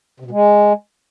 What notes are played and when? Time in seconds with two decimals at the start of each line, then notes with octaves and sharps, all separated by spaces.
0.20 C3
0.25 B2
0.31 G#3